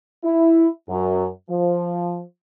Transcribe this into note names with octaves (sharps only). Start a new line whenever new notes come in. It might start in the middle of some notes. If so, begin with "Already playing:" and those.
E4
F#2
F3